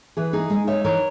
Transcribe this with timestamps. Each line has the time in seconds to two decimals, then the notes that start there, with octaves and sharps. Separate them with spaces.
0.17 E3 G#4 B4
0.33 D#4 G#4
0.50 G#3 G#4
0.67 D#4 C#5 E5
0.84 E3 A#4 C#5